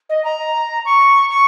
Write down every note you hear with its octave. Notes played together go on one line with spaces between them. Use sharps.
D#5
A#5
C#6
C#6